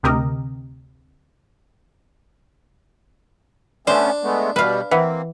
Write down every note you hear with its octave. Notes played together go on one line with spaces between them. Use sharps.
D2 C3 G4 A#4 D#5
A3 B3 C#4 D4 C5
G#3 A3 B3
B2 G3 B4 F5
E3 A#3 C4 B4 E5 F#5